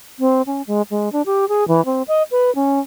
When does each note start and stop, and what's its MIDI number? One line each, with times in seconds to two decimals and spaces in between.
0.20 0.42 60
0.47 0.62 61
0.67 0.82 56
0.91 1.11 56
1.13 1.22 62
1.26 1.48 67
1.49 1.67 68
1.68 1.84 52
1.85 2.03 60
2.08 2.23 75
2.31 2.53 71
2.55 2.80 61